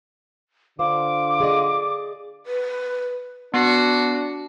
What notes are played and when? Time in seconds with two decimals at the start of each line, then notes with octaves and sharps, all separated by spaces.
0.79 D3 F4 C5 D6
1.40 G#4 D5 D#5
2.46 B4
3.54 B3 D4 F#4 C7